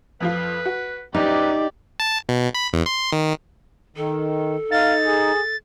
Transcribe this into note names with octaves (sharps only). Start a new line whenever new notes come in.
F2 F3 F4 B4
F#4
A#1 F#2 D#4 G4 B4 D5
A5
B2
B5
E2
C6
D#3
D#3 A4
D#4 F5 A6
G#4